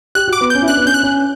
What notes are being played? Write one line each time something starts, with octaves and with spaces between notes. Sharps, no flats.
G4 F#6
F#4 D6
B3
C#4 G6
E4
D4 F#6
B3
C#4 G6
F#6
C#4